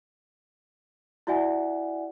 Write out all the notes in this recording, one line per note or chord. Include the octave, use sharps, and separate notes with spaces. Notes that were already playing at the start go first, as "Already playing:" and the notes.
E4 F#4 D5 E5 F#5 G#5